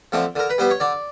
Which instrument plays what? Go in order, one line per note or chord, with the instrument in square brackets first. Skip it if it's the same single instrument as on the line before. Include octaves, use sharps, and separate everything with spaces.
[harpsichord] D3 F3 A3 C4
D3 A#4
B4
G3 B3 C5
C#5
D3 D5